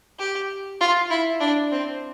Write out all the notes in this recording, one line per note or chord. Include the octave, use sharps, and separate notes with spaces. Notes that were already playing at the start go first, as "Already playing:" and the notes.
G4
F4
E4
D4
C4